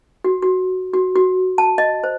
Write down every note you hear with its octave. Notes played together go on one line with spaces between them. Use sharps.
F#4
F#4
F#4
F#4
A5
D#5
C5